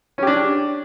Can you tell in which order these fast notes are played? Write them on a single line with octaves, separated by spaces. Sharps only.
C#4 G4 D4